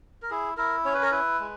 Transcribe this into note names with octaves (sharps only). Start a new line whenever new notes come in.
A#4
E4 G#4
E4 A#4
C#4 C#5
B4
A#4
E4 B4
G#3